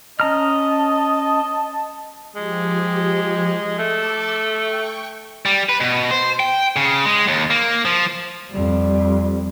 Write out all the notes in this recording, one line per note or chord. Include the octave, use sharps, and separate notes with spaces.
C#4 D#5 A5 A#5 F6
F3 G#3 G4
A3 A5 D6 E6
G5 C#6
G3
B4
B2
C5
G5
C#3
G#3
D#2
A#3
F3
F2 G3